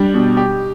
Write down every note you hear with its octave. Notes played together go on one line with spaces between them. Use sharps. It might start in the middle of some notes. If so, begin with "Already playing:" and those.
Already playing: G3 D4 G4
B2
G4